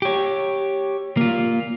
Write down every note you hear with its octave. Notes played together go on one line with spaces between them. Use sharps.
G4 C#5
A#3 F4